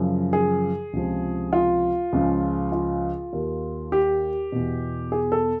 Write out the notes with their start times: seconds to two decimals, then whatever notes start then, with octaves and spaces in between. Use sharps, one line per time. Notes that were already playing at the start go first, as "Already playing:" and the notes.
Already playing: F#2 C#3 F3
0.33 G#4
0.93 C#2 C3 F3
1.53 F4
2.13 C#2 C#3 F3
2.72 F4
3.33 D#2 D#3
3.92 G4
4.52 E2 B2
5.12 G#4
5.32 A4